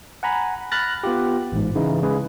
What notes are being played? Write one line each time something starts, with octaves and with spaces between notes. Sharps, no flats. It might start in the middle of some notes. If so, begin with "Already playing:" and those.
F#5 G#5 A#5 B5
B5 F6 F#6 A6 A#6
B3 F4 G4
A1 G#2
C#3 E3 D#4 E4
C#3 G#3 G#4 B4